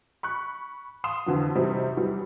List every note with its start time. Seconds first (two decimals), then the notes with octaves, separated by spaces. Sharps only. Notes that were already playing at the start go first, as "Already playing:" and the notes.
0.23 B5 C#6 F#6
1.04 F5 C6 D#6 E7
1.26 F2 D3 E3 F#3
1.55 C3 E3 F#3 G3 C4 D#4
1.97 E2 E3 F#3 G3